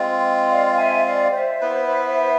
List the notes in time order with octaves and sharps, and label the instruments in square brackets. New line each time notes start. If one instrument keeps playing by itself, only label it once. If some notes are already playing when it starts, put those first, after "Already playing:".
Already playing: [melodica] G#3 C4 F4
[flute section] D5 F5
E5 G#5
D5 F5
C5 E5
[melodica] B3 E4 B4